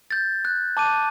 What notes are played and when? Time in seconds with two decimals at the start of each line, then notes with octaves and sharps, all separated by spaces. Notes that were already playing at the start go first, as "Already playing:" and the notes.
0.11 G6 A6
0.45 F#6
0.77 A5 D6 F#6 D#7